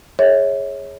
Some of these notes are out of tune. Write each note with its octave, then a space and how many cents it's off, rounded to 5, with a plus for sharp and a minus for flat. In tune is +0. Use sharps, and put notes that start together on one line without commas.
G#4 +0 C#5 -10 E5 -35